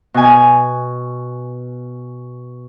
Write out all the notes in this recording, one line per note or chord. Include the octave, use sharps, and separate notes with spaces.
B2 G#5